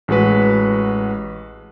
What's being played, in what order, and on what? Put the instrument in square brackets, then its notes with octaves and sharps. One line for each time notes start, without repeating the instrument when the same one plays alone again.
[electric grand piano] A1 G#3 F#4 B4